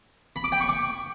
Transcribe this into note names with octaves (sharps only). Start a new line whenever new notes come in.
B5
D6
G5
C#6
D6